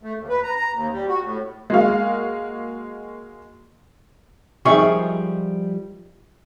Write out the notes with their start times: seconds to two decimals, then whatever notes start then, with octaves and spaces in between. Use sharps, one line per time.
0.03 A3
0.17 D#2
0.29 B4
0.43 A#5
0.56 A#5
0.73 D#2
0.92 G3
1.08 F#4
1.22 A2
1.70 G#3 A#3 F#4 F5
4.65 F3 G3 D#4 G#4 E5 C#6